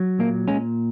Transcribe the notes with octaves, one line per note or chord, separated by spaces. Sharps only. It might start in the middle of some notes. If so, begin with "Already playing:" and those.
Already playing: F#3
A#2 A#3
A#2 G#3 C#4